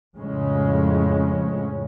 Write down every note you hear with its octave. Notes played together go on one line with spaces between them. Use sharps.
F2 A2 C#3 G#3 C#4